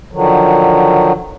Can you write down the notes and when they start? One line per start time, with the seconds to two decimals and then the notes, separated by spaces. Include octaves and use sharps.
0.12 D3 D#3 F3 F#3